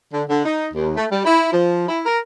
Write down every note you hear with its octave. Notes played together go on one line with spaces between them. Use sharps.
D3
D3
D#4
D#2
A3
G3
E4
F3
E4
A#4